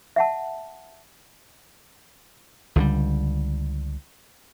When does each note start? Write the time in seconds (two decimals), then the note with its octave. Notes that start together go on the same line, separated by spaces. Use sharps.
0.16 E5 F#5 A5
2.76 C#2 D3 E3 G3